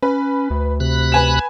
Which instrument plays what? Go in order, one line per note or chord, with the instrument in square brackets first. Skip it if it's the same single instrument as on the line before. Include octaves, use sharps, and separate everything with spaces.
[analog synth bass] C#4 [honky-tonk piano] B4
[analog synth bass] D2
[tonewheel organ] C3 B5 F#6
[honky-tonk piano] B4 G#5 E7